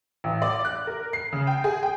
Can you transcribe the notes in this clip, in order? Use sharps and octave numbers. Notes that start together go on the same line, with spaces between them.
A1
D5
F#6
A#4
C7
C#3
G5
G#4
G5